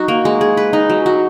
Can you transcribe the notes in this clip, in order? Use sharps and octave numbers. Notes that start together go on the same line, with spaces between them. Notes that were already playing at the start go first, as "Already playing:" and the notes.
Already playing: F#3 D#4 F#4
A#3
G#3
G#4
B4
D#4
F#3
F#4